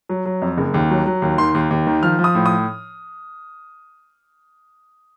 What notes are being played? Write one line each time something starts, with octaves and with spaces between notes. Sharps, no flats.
F#3
F#3
F2
F#1
D#2
F#3
F#3
D#2
D#3 C6
D#2
D#2
D#3
F3 F6
F3
D#6
A2
D#6